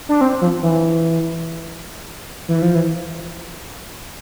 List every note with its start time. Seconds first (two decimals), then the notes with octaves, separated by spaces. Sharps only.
0.09 D4
0.21 C4
0.41 F3
0.63 E3
2.48 E3
2.62 F3
2.75 E3